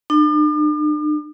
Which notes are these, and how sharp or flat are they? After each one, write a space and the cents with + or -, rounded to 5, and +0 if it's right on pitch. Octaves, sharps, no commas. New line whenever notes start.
D4 +45